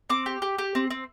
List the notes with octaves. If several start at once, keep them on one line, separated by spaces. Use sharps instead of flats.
C4 D6
G4
G4
G4
C4
C4